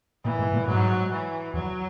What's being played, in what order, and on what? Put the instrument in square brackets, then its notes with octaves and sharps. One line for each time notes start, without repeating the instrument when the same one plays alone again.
[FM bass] A#2 [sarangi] E3
[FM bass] G#2
A#2
[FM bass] G#2 [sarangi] F#3
[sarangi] E3
[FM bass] E2 [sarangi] F#3